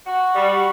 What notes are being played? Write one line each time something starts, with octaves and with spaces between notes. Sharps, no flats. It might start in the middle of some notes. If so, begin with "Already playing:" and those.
F#4
G3